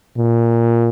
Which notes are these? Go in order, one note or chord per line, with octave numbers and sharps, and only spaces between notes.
A#2